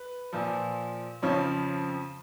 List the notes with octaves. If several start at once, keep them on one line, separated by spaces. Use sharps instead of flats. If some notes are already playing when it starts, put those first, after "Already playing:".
Already playing: B4
A#2 F3
F2 C#3 F3 C#5